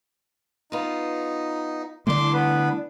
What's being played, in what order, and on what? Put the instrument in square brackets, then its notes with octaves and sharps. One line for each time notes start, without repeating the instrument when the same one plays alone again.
[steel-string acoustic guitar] B3 F4 [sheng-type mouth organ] D#4
[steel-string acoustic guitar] E2 D4 [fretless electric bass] D3 G3 A3 [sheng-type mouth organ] C6 D6
[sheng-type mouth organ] B3 B4